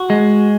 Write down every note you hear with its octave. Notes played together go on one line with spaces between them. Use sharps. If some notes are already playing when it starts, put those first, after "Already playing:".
Already playing: F#4
G#3